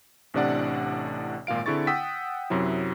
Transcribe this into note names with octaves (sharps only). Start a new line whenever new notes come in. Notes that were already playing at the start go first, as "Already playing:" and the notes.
A1 A2 C3 D4 D5 F#5
G#1 A#2 F4 F5 D7
D3 C4 E4 G#4 C#6 A6
F#5 G5 D#6 E6 B6
F#2 C3 F#3 E4